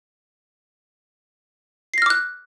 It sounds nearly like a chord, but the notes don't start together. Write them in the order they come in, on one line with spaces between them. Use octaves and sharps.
C7 A#6 F6 D6 F#6